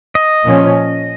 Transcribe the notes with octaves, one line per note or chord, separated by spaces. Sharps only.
D#5
A#2 F3 C#4